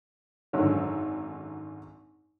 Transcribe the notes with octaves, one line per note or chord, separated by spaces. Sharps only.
G#1 F#2 D3 C#5